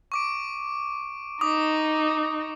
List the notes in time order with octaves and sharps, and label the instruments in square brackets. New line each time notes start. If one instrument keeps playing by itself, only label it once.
[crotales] C#6 D6 D7
[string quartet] D#4 [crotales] D6 D#6